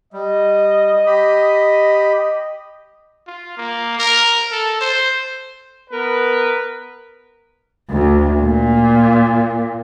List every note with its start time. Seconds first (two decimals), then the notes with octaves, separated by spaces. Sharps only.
0.13 G3 D#5
1.06 G4 B5
3.27 F4
3.57 A#3
3.99 A#4
4.52 A4
4.81 C5
5.91 B3 A#4 B4
7.91 D2
8.41 A#2